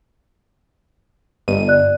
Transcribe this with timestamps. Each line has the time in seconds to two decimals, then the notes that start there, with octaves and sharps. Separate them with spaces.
1.48 G1 D#5 D#7
1.68 D5 F#6